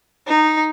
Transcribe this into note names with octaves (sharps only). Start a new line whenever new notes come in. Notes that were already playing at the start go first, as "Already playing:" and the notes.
D#4